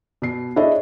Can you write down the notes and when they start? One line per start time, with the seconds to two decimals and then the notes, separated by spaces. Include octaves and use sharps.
0.22 B2 C7
0.56 D4 E4 G#4 A4 C#5 D#5